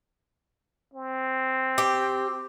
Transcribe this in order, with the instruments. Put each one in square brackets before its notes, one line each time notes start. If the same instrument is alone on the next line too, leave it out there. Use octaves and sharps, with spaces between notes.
[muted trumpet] C4
[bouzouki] G4